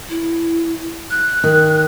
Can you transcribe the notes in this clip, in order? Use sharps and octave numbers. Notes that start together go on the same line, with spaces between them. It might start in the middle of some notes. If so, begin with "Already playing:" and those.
E4
F#6
D#3